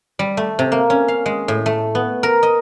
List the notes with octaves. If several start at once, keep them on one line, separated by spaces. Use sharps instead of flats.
G3
A3
C3
A#3
C#4
F5
G#3
A2
A3
B3
A#4
D#5